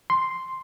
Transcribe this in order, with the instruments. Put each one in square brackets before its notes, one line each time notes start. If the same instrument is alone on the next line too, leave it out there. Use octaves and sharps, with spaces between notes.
[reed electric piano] C6